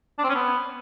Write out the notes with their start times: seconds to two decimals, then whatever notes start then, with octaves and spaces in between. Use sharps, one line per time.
0.19 D4
0.24 C4
0.29 C#4
0.35 B3